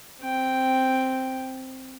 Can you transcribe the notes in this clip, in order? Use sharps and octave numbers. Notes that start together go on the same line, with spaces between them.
C4 G5